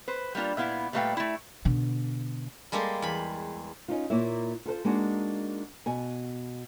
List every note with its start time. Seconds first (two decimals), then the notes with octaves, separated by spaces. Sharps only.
0.08 B4 C5
0.35 G3 A#3 D4 F4
0.57 A#2 B3 E4 F5
0.93 A#2 G3 A3 B4 F5 G5
1.17 A3 E4
1.65 B2 D3
2.72 G3 G#3 A#3 G4 A4 C6
3.02 E2 B5
3.88 C#4 D#4 F4
4.10 A#2 A#3 E4 C#5 E5
4.66 F4 A4 B4 C5
4.85 G#3 A#3 D4 D#4 F#4
5.86 B2 G#5